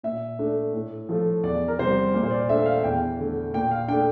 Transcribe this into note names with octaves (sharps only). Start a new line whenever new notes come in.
A#2 E5
A3 D4
A2
F3 A3
E2 D5
A#4
C3 G3 C5
A#2
C5
D5
A3 D4 E5
F5
E2 G5
D3 A3
A#2 G5
F5
A3 D4 G5